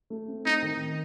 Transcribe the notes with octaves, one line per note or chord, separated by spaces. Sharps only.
A3
C4
C4 D#4
D#3